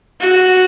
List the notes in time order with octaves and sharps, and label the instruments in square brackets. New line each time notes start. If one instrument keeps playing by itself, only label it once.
[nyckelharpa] F#4